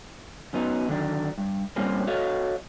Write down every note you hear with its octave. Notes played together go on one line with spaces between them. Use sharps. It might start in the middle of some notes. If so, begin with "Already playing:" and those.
F#2 F#3 B3 D#4
D3 D#3 F#3 D4
G2
G2 A#2 G3 A#3 C4 C#4
F#4 A4 C#5 D#5 F5